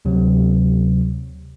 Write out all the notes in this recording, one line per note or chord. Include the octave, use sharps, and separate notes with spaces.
D2 C3 F#3